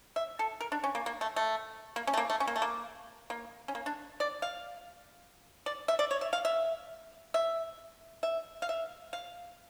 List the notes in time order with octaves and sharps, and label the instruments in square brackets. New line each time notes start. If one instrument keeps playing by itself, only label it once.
[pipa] E5
A4
A#4
D4
C#4
A#3
A#3
A3
A3
A#3
C#4
A3
A#3
A3
C#4
A#3
A3
A#3
A#3
C#4
A#3
D4
D5
F5
D5
E5
D5
C#5
E5
F5
E5
E5
E5
F5
E5
F5